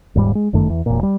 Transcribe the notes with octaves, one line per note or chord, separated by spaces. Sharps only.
D#1 G#2 G3
G#3
G1 F#2 D#3 A3
E2
E1 A#2
G3